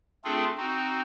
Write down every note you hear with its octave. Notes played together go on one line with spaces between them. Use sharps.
A3 C4 D4 F4 G#4 A4
C4 D#4 F#4